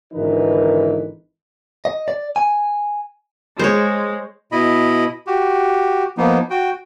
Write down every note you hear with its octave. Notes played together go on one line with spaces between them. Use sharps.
G#1 D3 E3 D#4 A#4 B4
D#5
D5
G#5
G#3 C5 C#5
B2 E4 D#5 B5
F#4 G4
F3 A#3 B3 D#4
F#4 G5